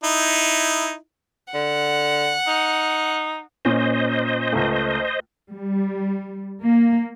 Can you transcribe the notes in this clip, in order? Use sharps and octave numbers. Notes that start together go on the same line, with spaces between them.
D#4 E4
D3 F#5
D#4
A#2 C#4 C5 D#5
C#2 A3
G3
A#3